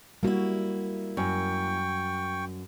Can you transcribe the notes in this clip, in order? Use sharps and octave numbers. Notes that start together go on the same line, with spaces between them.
G3 A#3 E4 F#4
F#2 G5 C#6